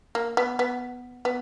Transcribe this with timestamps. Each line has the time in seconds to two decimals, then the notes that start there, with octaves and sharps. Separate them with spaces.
0.15 A#3
0.37 B3
0.59 B3
1.25 B3